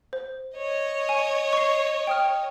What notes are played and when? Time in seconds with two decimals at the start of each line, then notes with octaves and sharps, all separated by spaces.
0.13 C5
0.56 C#5 D#5
1.09 G#5
1.53 C#6 C7
2.07 G5 D#6 F6